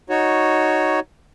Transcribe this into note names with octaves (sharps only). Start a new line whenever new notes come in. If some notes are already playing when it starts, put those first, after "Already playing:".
D#4 F#4 C#5